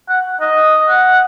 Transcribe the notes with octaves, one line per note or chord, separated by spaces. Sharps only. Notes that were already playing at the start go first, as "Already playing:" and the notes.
F#5
D#5
F#5